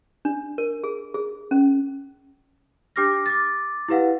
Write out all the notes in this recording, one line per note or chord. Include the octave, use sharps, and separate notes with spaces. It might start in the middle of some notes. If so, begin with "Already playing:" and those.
D4
A#4
G#4
G#4
C#4
D4 G4 D6 F6 A#6
D6 A6
E4 G4 B4 F5 F#5